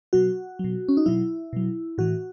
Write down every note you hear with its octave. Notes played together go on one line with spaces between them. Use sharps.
B2 F#3 F#4
B2 F#3
C#4
D#4
B2 F#3 E4
B2 F#3
A2 E3 F#4